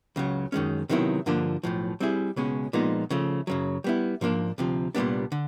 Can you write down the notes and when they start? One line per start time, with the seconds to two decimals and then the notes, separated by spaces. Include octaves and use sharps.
0.16 C#2 C#3 F#3
0.52 F#2 D#3 G#3 C#4
0.89 C3 D#3 F#3 B3 E4
1.26 G2 D3 F3 A#3 D4
1.63 B1 A2 F3
2.00 G3 C4 E4 G#4
2.36 C#2 B2 G#3 C#4
2.73 A#2 F3 G#3 B3 D#4
3.10 C#3 F3 A3
3.47 F#2 C#3 F#3
3.84 G3 B3 E4
4.21 G#2 F3 A#3 D4
4.58 D2 C3 F3
4.95 C2 A#2 G3 B3 D4
5.32 D3